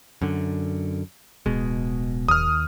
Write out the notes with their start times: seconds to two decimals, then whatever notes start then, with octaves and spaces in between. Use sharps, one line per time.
0.22 F#2 D3
1.46 D1 B2 G#3
2.28 D#2 D#6 F6